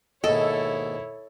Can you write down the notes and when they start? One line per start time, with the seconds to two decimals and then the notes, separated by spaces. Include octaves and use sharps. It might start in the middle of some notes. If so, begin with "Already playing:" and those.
0.24 D#2 G#2 B2 E4 A4 C#5 D#5